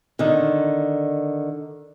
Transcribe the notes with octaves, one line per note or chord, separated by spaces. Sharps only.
D3 D#3